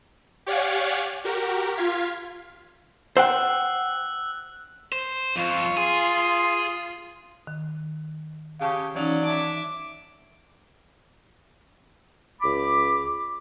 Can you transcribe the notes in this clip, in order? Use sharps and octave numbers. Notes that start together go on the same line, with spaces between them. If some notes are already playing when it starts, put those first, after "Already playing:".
G4 C#5 D5 F5 F#5 G#5
F#4 G4 A#4
F4 F5 G#6 B6
C5 F#5 G5 E6 F#6
C5
F2 F4 C#6
G#4 C6
D#3
C#3 G4 F5 A5 C#6
E3 F#3 C#4 D#4 C#5 D5
E5 A5 D6
C#2 B5 D6